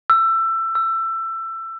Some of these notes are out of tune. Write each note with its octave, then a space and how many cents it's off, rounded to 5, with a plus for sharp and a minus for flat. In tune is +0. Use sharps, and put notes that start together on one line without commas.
E6 +20
E6 +20